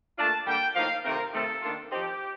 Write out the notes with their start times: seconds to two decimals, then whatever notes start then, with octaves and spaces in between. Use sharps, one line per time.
0.17 A#2 A3 D4 F4 A5
0.46 D3 G3 A#3 G5
0.75 A2 F3 A#3 D#4 F5
1.04 C3 D#3 A3 C4 A#4
1.33 C3 D#3 A3 C4 F4 A4
1.62 D#3 A#3 D4 F4
1.91 F3 C4 D#4 G4